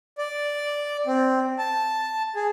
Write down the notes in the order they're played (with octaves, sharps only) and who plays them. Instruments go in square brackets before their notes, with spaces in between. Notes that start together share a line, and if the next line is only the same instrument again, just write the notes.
[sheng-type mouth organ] D5
C4
A5
G#4